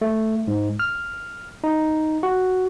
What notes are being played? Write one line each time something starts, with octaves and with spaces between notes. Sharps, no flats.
A3
G#2
F6
D#4
F#4